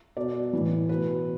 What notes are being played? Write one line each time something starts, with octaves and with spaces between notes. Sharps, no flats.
B2 D5
A2 E3
B2 B4